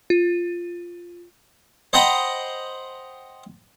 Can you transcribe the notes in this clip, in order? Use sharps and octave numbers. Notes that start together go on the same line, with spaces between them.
F4
C5 D#5 F#5 G5 A#5 B5